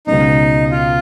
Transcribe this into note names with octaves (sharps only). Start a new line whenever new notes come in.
C#2 B2 G#3 C#4 D#4
F4